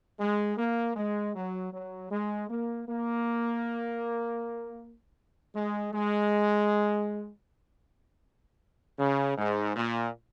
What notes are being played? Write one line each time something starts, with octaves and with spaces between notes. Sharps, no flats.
G#3
A#3
G#3
F#3
F#3
G#3
A#3
A#3
G#3
G#3
C#3
G#2
A#2